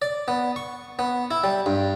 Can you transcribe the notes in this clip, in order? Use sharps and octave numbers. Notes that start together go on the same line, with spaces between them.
D5
B3
C#6
B3
E4
G3
G2